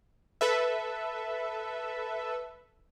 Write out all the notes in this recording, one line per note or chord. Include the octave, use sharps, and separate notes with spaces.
A4 B4 E5